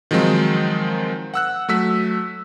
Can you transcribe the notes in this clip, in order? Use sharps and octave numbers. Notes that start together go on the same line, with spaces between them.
D#3 F3 F#3 G#3 C4 D#4
F#5 E6 F#6
F#3 A3 E6 B6